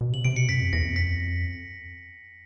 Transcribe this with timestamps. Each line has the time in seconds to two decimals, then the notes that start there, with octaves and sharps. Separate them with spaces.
0.01 B2
0.13 C3 F#7
0.25 C3 D7
0.36 B2 C#7
0.49 F#2 B6
0.60 F2
0.73 E2 A#6
0.83 F2
0.96 B6